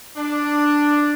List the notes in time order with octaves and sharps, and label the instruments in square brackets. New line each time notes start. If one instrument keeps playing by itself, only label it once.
[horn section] D4